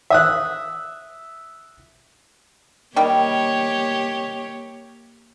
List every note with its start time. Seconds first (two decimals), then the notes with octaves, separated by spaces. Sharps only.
0.10 E5 D#6 F#6
2.96 D#3 G3 A#3 G4 C#5